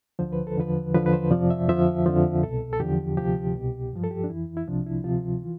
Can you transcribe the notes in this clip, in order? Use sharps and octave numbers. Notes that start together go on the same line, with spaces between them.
D2 D3 F3 C5
B4
A4
E2 D3 F3 B4
E2 D3 F3 B4
B4
C5
F2 C3 F3 D5
E5
F2 D3 F3 E5
F2 D3 F3
C2 B2 A4
A4
E2 D3 F3 G4
D2 C3 F3 G4
C2 B2
G2 F3
A4
G4
D4
F2 E3 E4
E4
C2 C3 F3 D4
E4
D2 C3 F3 F4
E3